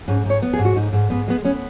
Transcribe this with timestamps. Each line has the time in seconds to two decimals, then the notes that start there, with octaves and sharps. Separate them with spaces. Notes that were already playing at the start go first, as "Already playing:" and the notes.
0.08 G#2 C#4
0.25 G#2 C#5
0.42 B3
0.53 G#4
0.59 G#2
0.65 F#4
0.76 G#2 D#4
0.93 G#2
1.10 G#2 B3
1.28 G#3 B3
1.45 B3 C#4